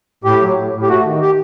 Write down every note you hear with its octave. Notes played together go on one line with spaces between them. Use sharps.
A2 G4
F#3
A2
A2
G4
A3 F#4
D#3
G4